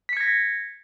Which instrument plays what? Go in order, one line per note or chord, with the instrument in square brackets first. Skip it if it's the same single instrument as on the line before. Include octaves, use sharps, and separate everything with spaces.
[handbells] B6
C#7
G#6
A#6